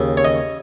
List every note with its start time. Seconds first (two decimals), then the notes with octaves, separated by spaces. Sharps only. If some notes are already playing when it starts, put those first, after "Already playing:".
Already playing: D#2 C#3
0.17 C#5
0.25 D#5